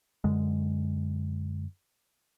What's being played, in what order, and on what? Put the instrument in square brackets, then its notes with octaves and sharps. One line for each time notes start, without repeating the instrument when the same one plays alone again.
[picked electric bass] F#2 D3 G#3